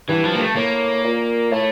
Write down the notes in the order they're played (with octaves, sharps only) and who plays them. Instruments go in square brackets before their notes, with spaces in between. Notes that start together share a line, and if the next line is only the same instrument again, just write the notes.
[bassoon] G2 [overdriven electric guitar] E3
[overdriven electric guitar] F3
A#3
A3
[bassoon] A2 [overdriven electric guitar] A#3
[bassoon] A#2
[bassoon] A2 [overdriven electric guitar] A3